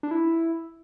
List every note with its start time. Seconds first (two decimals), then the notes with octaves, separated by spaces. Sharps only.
0.03 D4
0.11 E4